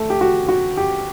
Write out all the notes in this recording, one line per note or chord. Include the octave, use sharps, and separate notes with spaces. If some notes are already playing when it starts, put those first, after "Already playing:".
Already playing: A3
G4
F#4
F#4
G4